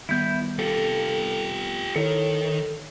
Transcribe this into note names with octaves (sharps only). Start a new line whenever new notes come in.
D#3 G3 B3 E4 G6
F4 G4 A4
D#3 E4 A4 C#5